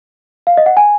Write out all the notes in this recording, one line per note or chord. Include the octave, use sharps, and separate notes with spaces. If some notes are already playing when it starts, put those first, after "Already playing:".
F5
D#5
F#5
G#5